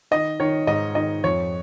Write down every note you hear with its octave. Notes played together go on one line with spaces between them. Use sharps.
D#3 D#5
D#3 C#5
G#2 D#5
D#3 D#5
F2 C#5